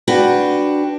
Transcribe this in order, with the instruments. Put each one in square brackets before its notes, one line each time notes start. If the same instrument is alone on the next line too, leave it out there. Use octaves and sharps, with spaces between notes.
[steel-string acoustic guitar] D4 F#4 B4 G5